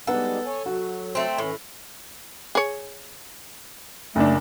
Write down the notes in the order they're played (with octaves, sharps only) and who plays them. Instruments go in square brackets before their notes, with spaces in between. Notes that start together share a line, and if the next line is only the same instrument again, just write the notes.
[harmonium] G3 G#3 D#4 [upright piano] B3 F#5 [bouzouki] A4
[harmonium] C#5 G#5
[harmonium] F#3 [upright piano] F#4
[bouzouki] A3 C4
[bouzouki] A2 [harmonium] E3 C#4
[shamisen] G#4 C#5
[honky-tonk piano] F#1 D4 [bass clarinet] A3